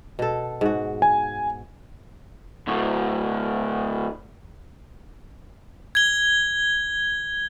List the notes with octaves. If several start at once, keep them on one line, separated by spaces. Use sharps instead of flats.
B2 A4
G#2 F#4
G#5
D2 A2
G#6 G7